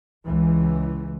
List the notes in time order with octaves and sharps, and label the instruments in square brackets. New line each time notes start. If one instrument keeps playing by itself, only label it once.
[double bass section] C#2 E3